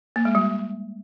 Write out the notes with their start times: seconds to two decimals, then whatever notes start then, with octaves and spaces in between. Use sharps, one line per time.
0.16 A#3
0.25 G#3
0.35 G3